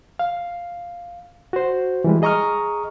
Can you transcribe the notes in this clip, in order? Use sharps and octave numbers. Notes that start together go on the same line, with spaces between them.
F5
F#4 C5
E3 G3 G#3
G#4 D#5 A#5 C#6 D#6 F6